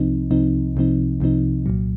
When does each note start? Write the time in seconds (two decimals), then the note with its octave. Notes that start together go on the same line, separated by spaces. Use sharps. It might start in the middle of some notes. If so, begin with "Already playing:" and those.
Already playing: C2 C3 F3 C4 D#4
0.30 C2 C3 F3 C4 D#4
0.75 C2 C3 F3 C4 D#4
1.20 C2 C3 F3 C4 D#4
1.66 C2 A#2 F#3